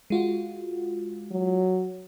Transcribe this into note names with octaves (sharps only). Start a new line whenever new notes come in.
G#3 F4 F#4
F#3